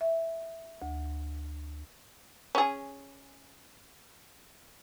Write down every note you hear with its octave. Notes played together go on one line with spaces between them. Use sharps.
E5
D2
C#4 G#4